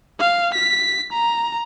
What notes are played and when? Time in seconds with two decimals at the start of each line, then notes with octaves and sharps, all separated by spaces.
0.19 F5
0.54 B6
1.13 A#5